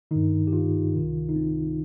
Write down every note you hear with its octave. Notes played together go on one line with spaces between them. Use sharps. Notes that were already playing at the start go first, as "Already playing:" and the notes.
G2 D#3 D#4
G4
F4
C2 C3 D#3
D#4
C4